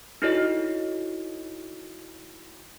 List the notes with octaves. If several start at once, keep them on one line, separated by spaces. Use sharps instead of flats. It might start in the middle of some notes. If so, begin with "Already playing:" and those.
D#4 E4 F#4 A4 C#5 D#5